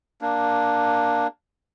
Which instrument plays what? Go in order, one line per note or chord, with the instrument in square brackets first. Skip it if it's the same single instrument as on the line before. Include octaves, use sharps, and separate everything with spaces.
[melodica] A#3 D4